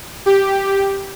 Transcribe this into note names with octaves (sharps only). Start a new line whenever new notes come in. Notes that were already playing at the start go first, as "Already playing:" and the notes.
G4